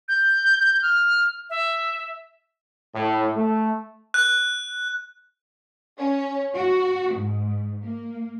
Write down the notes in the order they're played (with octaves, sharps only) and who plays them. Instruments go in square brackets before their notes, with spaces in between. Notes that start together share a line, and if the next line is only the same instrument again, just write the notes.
[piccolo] G6
F6
E5
[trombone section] A2
A3
[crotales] F#6
[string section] C#4
F#4
G#2
A#3